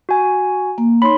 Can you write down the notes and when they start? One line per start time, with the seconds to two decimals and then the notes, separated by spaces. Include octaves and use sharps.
0.09 F#4 G#5
0.78 A#3
1.02 D#4 C#5 B5 C6